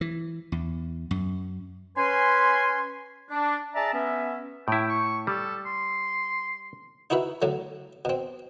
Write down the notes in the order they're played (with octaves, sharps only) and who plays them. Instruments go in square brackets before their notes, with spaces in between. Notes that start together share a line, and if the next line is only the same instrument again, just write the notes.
[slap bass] E3
E2
F#2
[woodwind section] C#4 B4 G#5 C6
D4
G#4 D5 E5 A5 A#5
B3 C#4 E5
[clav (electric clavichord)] A2 E4 [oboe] G5
[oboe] C#6
[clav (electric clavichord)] G3 [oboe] A4
[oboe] C6
[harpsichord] D#4 E4 F#4 B4 E5
A2 D3 F#3
B2 C4